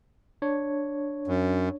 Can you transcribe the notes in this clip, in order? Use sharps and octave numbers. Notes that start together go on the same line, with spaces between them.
D4 C#5
F#2